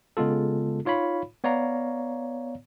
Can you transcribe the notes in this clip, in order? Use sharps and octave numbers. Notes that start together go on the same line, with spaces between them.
C#3 G#3 B3 F4 A4
D#4 F4 C#5 F5 B5
B3 C#5 D5 F5 A#5